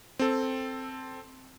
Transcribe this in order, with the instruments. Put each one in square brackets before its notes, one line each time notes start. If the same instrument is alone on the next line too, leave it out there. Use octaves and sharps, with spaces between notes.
[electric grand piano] C4 A4